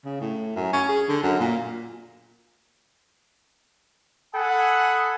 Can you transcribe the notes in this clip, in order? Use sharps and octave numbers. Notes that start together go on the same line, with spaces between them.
C#3
A2
F#2
C#4
G#4
D3
F#2
A#2
A4 F#5 G#5 B5 D#6